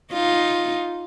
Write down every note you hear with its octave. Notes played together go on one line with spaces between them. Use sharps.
D#4 F4